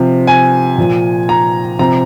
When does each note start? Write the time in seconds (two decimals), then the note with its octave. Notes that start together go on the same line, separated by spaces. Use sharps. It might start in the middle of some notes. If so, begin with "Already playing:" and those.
Already playing: C3 F3
0.27 G#5
0.78 A#2 F3
1.29 A#5
1.79 C3 F3 A#5